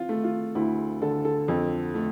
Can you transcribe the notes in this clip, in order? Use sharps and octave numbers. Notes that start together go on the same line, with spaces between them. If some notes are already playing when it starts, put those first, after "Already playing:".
Already playing: C4 F4
A3
F4
D2 E4
D3 A4
A4
F2
A3